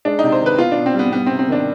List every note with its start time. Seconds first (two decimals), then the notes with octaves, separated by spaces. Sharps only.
0.05 G#3 D4
0.19 C3 D#4
0.32 C5
0.41 D#3 B4
0.59 B2 F4
0.72 D4
0.77 B2
0.86 C4
0.94 G3 B3
1.12 G3 B3
1.26 C4
1.31 C3
1.39 C4
1.48 D#3 D4